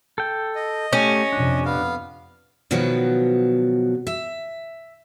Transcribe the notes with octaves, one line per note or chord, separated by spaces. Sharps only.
A4 G5
D#5
A3 C#4 G4
F2 C3 D4
B3 F5
B2 D#3 F3 F#3 B3
E5